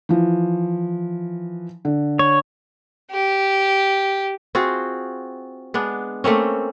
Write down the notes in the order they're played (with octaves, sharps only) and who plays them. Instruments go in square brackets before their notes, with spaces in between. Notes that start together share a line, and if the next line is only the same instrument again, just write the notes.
[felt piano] E3 F3
D3
[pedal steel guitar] C#5
[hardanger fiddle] G4
[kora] C4 F4 F#4 G#4
G#3 B3 D4
A3 A#3 C4 C#4